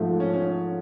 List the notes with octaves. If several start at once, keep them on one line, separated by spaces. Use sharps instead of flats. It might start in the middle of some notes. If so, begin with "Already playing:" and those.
Already playing: G#2 F3 A3
C#4
C#4